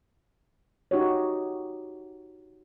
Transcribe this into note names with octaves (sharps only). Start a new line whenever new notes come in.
D#4 F#4 G4 C#5